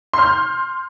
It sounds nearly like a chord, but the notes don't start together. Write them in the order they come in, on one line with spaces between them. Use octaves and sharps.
C6 F6 G6